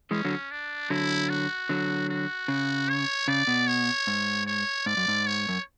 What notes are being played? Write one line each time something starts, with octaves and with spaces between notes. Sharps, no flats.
E3 G#3 C#4
D3 F#3
D4
D3 F#3 E4
F#4
D3 F#3
F#4
C#3
C#5
C#3 D5
B2
C#5
G#2
C#5
G#2 D5
F#2
G#2
C#5
F#2